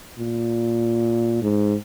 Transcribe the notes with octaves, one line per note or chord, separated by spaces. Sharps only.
A#2
G#2